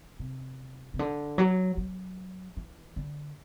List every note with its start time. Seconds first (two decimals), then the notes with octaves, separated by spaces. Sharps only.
0.19 C3
0.94 C3
0.99 D3
1.38 F#3
1.77 F#3
2.57 E3
2.96 D3